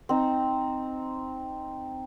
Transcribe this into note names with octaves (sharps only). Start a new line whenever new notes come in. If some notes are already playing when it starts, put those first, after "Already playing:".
C4 D#4